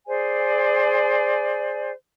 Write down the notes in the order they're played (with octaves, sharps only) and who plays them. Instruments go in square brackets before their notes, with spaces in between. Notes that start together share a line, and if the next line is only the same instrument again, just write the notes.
[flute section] G#4 C5 D5 G#5